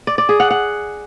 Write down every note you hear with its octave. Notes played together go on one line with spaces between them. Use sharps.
D5
D5
G#4
F#5
F#5